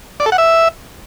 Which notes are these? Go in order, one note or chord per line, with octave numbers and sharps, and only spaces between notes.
D5
A4
F#5
E5